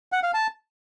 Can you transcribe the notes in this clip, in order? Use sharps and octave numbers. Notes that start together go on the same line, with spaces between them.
F#5
F5
A5